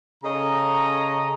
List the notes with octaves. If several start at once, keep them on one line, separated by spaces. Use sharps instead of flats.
C#3 A4 C#5 D#5 A#5